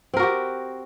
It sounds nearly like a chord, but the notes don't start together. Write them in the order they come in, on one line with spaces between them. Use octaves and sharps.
C4 A#4 F#4 G4